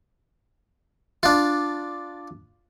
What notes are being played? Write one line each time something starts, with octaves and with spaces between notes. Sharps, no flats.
D4 F4